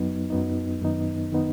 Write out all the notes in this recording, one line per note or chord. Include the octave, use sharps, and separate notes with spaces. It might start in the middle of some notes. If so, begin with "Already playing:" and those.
Already playing: F#2 F#3 B3 D#4
F#2 F#3 B3 D#4
F#2 D#3 B3 D#4
D#3 B3 D#4